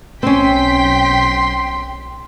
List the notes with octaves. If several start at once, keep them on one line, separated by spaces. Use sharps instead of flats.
B1 C4 C#4 G5 C6 B6